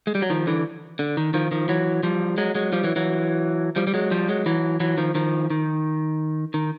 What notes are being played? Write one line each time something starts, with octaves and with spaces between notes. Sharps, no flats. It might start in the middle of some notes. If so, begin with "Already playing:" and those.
G#3
G3
F#3
D#3 F3
D3 E3
D3
D#3
D#3 F3
D#3 F3
E3 F#3
F3 G3
F#3 G#3
F#3 G#3
F3 G3
E3 F#3
E3 F#3
F3 G3
G3
F#3 G#3
F3 G3
F#3 G#3
E3 F#3
E3 F#3
D#3 F3
D#3 F3
D#3
D#3